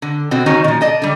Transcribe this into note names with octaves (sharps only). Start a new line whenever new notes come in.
D3
B2 C4 F#4
D#3 F#3 C#4 D#4 F#4
A#2 F3
D5 D#5 A5
D3 G3